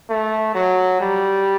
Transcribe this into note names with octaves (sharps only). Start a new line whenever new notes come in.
A3
F#3
G3